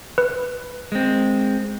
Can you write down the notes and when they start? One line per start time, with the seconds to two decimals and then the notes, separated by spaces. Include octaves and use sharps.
0.18 B4
0.92 G#3 C4